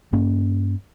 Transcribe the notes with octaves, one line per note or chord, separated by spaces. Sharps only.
G2 A#3 C#4